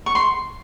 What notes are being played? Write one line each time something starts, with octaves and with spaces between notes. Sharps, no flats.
C#6
C6